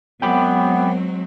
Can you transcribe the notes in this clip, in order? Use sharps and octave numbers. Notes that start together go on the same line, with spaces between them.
F#2 F#3 G#3 B3 C4 G5 B5 D6